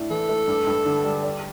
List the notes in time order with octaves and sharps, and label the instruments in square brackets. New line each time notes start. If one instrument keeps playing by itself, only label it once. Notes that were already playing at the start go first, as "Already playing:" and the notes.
Already playing: [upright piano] A2 D4
[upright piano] E3 [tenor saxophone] A4
[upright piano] A3
G2
G2
D3
G3
D5